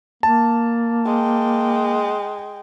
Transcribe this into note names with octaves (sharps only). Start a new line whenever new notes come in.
A#3 A5
G#3 G5